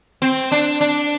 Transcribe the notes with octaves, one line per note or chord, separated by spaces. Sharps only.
C4
D4
D4